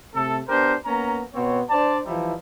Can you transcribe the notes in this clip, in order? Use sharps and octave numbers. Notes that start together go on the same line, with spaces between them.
C3 A3 A4
B3 D4 G4 A#4 C5
A#3 B3 C#4 A#5
B2 B3 C4 C#5
D4 C5 D5 A5
E3 F3 G3 D#4 E4